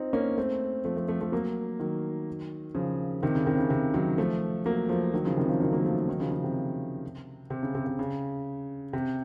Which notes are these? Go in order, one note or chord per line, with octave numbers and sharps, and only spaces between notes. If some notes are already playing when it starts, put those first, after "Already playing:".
Already playing: C4 D#4 F4
A#3 C#4
A3 C4
F3 A3
F3 A3
F3 A3
F3 A3
F#3 A#3
D#3 F#3
C#3 F3
C3 D#3
C#3
C3 D#3
C#3
C3
D#3 F#3
F3 A3
F#3 A#3
F3 A3
D#3 F#3
C#3 F3
C3 D#3
C#3 F3
D#3 F#3
F#3 A#3
F3 A3
D#3 F#3
C#3 F3
C#3
C3
C3
C#3
C3
C3
C#3
C3